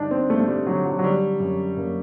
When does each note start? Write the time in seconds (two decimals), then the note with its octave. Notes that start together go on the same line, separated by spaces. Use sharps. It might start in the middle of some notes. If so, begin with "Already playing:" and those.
Already playing: G2 D3 D4 D#4
0.11 C4
0.30 G2 A3
0.40 A3
0.48 G3
0.67 D3 F#3
0.85 F#3
0.99 F#3
1.04 D3 G3
1.40 F#2
1.76 F#2 A#3